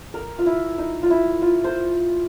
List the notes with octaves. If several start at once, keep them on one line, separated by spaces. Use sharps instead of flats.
A#4
F4
E4
D#4
F4
E4
F4
C5